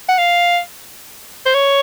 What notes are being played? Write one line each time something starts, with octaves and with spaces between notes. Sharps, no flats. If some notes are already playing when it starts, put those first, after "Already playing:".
F#5
F5
C5
C#5